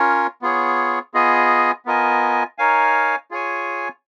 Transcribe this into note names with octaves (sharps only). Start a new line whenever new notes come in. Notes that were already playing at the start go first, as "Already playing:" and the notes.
Already playing: C#4 F4 A#4 C#5
B3 F4 G#4 C#5
B3 F4 G#4 D#5 G#5
B3 F4 A#4 D#5 G#5
D#4 A#4 C#5 F5 G#5
F4 G#4 C#5 G#5